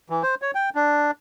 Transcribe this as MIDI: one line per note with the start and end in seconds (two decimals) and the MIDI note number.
0.10 0.23 52
0.23 0.35 72
0.42 0.51 73
0.55 0.70 79
0.75 1.11 62